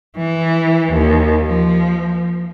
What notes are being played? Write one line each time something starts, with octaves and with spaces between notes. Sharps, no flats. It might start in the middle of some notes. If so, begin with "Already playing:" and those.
E3
D#2
F3